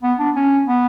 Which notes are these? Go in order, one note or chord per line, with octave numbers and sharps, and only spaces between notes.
B3
D4
C#4
B3